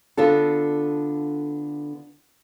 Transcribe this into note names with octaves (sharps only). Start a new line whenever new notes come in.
D3 B3 D4 F4 A4